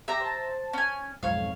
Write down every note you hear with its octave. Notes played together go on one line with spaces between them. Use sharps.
G4 E5 A#5
C5 A5
C#4 G#5
B1 F2 G#2 C#5 F5